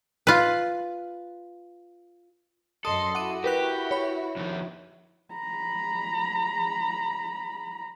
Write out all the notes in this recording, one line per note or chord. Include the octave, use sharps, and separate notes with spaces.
F4 B4
F#2 A4 D#5 C6 D#6
E4 F#4 F#5 D6 D#7
G4 A#4 B4 F#6
C#5 B5
F2 D#3
A#5 B5